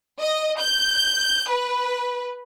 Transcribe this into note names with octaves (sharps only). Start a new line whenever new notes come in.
D#5
G6
B4